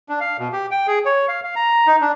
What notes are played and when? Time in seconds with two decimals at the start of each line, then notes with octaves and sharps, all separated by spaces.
0.09 D4
0.20 F5
0.39 B2
0.53 G4
0.71 G5
0.87 G#4
1.06 C#5
1.28 F5
1.44 F5
1.56 A#5
1.87 D#4
2.01 D4